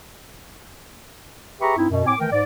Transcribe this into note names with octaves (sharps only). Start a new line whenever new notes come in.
G4 G#4 B4 E5 A#5 C#6
G2 C4 D#4 E4
F#2 B2
A2 C4 G#5 D6
D#3 E3 A3 A#4 G5
G#2 D5